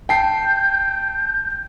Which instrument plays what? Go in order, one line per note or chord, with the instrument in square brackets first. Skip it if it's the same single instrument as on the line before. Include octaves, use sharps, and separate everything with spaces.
[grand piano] G5 A5 C7 [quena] G6